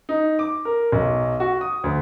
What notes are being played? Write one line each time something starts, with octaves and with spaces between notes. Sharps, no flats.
D#4
D6
A#4
B1
F#4
D#6
D2